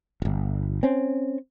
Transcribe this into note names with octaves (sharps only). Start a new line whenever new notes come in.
D1 G1
C4 C#4